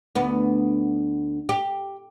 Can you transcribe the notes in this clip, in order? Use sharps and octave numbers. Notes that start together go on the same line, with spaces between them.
D2 B3
G4